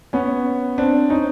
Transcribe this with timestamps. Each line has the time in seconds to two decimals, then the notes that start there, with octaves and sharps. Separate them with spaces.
0.13 B3 C#4
0.78 C4 D4
1.10 C#4 D#4